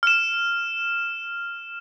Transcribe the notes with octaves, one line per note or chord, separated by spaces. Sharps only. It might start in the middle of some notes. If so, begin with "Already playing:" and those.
F6 E7